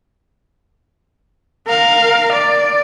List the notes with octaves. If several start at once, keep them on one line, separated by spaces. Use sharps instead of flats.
A#4 F5
D5